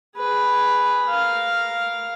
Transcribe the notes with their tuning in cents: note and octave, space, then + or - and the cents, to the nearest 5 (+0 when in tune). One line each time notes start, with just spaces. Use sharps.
G#4 +0 B4 +0
A#4 +0 F5 +0